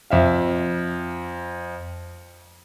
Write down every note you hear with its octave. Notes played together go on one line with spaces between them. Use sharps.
F2 E5 F5